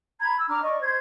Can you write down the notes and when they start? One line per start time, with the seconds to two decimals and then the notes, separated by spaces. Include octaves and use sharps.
0.19 A#5 B5 G#6
0.37 E6
0.48 D4 A#5 D6 F6
0.62 D5 D#5 C#6
0.81 C5 G#6